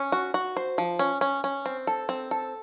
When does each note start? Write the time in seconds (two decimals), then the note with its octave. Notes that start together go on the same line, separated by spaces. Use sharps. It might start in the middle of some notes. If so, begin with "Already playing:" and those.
Already playing: C#4
0.12 F#4
0.34 F#4
0.57 C5
0.78 F3
0.99 C#4
1.21 C#4
1.44 C#4
1.66 C4
1.87 A4
2.09 C4
2.31 A4